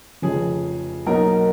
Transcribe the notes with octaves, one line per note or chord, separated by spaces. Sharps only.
F1 F2 C#3 F3 G#4
B1 B2 F#3 A#3 D#4 A#4